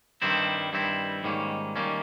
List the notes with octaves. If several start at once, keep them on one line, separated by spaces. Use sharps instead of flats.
G2 D#3 G3 C4 E4
G2 D#3 G3 C4 E4
G#2 D#3 G3 A#3 C#4
D#3 G3 A#3 C#4